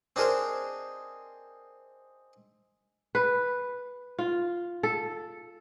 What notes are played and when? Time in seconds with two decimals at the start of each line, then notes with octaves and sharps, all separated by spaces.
0.16 C4 D4 D#4 G#4 A#4 C5
3.15 B4
4.18 F4
4.83 A4